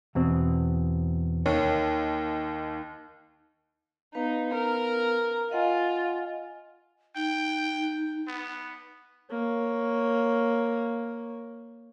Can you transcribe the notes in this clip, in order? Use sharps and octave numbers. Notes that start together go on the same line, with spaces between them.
E2 B2 C4
D#2 C#5
B3 D#4 B4 F5
A#4
F4 D#5 F#5 G#5
D#4 G5
B3
A#3 C#5